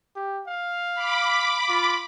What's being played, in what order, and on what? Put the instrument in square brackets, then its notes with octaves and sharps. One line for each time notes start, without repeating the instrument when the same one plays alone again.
[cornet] G4
F5
[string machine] B5 D6
[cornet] F4